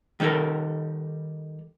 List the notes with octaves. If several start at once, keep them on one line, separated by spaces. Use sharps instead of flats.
D#3 G3 D#4 A4 A#4